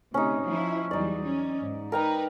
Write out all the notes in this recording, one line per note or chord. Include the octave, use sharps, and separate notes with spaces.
D2 C3 C#4 D#4
F3 E4
E2 F#3 G3 D#4 D5
C#4
G#2
D#4 A#4 B4 G5 A#5